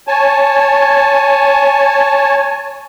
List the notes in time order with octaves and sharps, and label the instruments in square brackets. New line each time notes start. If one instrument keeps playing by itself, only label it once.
[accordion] C#5 G#5 A5